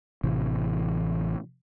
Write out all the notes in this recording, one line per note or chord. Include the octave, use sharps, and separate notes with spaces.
A1 C3 E3